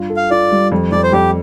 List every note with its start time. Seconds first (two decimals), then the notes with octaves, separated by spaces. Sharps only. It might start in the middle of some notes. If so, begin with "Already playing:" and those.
Already playing: G2 F4
0.10 A4
0.17 F5
0.31 F4 D5
0.51 G3
0.72 F2
0.92 F2 D5
1.03 C5
1.12 F2 G4